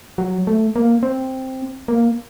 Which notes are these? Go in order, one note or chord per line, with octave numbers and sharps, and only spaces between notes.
F#3
A3
A#3
C4
A#3